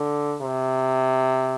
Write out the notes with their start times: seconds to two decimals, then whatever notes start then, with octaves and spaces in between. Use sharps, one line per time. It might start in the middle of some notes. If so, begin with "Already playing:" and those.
Already playing: D3
0.41 C3